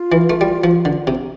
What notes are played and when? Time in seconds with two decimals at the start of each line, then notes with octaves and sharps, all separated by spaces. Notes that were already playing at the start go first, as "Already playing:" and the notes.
Already playing: F4
0.12 E3
0.30 A3
0.41 G3
0.64 F3
0.85 D3
1.07 C3